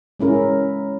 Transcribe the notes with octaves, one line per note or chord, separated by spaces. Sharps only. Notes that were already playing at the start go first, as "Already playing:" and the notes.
G#3 C#4 E4 A#4